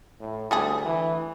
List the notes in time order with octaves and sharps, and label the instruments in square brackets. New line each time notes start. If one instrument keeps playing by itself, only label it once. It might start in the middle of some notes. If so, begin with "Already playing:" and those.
[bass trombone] A2
[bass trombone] D2 [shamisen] G3 A3 G#4
[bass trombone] E3